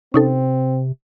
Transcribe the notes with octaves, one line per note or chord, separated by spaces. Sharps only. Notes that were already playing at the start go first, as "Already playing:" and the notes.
C3 C4 C#4 D#4 A4